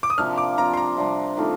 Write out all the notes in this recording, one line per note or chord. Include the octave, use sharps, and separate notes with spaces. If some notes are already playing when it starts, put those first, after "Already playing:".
D6
D#6
C3 F3 A#3 D4 F6
D6
F3 C4 F4 A#5
C6
A#5
C3 G3 D4
D#3 A3 C4 F4